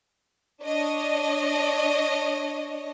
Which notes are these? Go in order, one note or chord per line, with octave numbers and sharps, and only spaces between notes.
D4 C#5 D#5